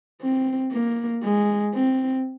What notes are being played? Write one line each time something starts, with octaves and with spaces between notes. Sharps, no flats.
C4
A#3
G#3
C4